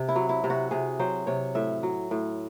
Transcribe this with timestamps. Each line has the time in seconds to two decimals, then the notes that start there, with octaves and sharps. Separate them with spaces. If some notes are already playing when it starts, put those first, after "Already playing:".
Already playing: C3
0.09 E4
0.16 F#3
0.29 E4
0.44 C3
0.50 F#4
0.71 C3 G#4
0.99 F#3 C5
1.27 C3 C#5
1.55 A2 E5
1.83 F#3
2.11 A2